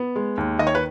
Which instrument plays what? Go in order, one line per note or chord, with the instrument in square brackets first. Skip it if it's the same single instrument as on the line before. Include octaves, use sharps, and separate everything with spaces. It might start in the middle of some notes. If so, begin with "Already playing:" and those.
Already playing: [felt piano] B3
G#3
D#2
D#3 D#5
C#5
B4